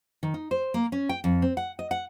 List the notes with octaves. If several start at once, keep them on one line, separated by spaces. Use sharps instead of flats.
D#3
D#4
C5
A#3
C#4
G5
F2
C4
F#5
D#5
F#5